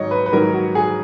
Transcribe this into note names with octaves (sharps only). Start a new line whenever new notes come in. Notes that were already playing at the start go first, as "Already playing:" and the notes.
Already playing: G#2 D#3 F#3 C#5 D#5
B4
B4
G#2 D#3 F#3 A#4
F#4
G#4